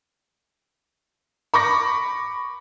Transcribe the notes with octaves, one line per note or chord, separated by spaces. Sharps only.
B5 C#6 D6 A#6